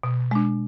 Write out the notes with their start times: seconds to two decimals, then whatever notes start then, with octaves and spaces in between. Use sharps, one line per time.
0.03 B2
0.31 G#3 D4